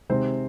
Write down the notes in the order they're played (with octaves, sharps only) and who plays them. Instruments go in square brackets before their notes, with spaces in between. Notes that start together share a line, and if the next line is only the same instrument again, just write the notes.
[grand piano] C3 D#3 G#3 C4 C5